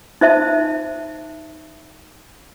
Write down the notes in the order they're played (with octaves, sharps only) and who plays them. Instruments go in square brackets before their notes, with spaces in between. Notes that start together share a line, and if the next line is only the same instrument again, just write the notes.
[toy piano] D#4 C5 E5 A5